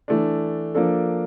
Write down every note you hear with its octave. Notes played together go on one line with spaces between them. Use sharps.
E3 A3 D4
F3 A#3 D4 A4